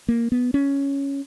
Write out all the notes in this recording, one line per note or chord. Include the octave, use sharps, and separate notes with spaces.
A#3
B3
C#4